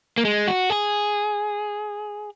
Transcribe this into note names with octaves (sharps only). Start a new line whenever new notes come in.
A#3
G#3
F#4
G#4